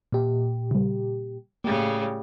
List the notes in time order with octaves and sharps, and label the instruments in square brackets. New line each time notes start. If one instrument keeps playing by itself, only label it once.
[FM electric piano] A#2 G4
[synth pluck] C#3 G3
[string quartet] A2 C#3 G3 [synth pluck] A#3